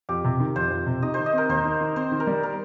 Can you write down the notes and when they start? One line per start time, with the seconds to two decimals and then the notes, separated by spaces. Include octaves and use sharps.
0.09 F2 G4
0.24 C3
0.40 D#3
0.56 F2 C5
0.71 F2
0.87 C3
1.02 D#4 D#5
1.14 D#3 C5
1.26 D#5
1.33 C4 A#4
1.49 D#2 C5
1.65 D#4
1.81 D#3
1.96 C4 C5
2.12 D#3
2.20 A#4
2.27 G3
2.43 A#4